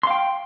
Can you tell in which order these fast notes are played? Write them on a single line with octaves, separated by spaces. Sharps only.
C6 F5 G5